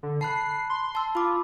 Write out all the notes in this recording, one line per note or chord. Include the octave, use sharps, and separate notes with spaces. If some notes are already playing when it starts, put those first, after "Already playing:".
D3
A5 B5 F#6 C7
C6
A5 E6
F4 B5 D6